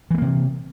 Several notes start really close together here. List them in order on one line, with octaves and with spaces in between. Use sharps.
E3 A3 A#3 C3